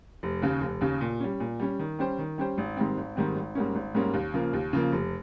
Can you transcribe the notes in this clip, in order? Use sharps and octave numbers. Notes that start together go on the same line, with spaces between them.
F1
D#2 C#3
F1
D#2 C#3
A#2
G3 C#4
A#2
G3 C#4
D#3
G3 C#4 G4 C5
D#3
G3 C#4 G4 C5
G#1
G#2 D#3 G3 C4
G#1
G#2 D#3 G3 C4
G#1
G#2 G3 A#3 C#4
G#1
G#2 G3 A#3 C#4
D#2
C#3 F3 A#3
D#2
C#3 F3 A#3
F1